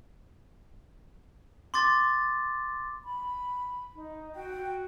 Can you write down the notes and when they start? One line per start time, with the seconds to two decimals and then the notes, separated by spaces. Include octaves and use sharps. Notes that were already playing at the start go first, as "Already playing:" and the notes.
1.74 C6 D6 A6
3.04 B5
3.95 D#4
4.35 F#4 G5
4.57 F#4